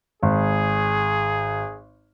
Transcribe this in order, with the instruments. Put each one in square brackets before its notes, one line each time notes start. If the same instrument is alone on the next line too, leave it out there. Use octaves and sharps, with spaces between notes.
[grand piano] G#1 [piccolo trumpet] G#4